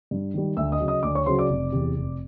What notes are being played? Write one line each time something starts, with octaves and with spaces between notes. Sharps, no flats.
G2
D#3 G3
D2 E5 E6
D#5 D#6
C#3 F#3
D#5 D#6
D2 D5 D6
C#5 C#6
C#3 F#3 C5 C6
D5 D6
F1
E2 C3
F1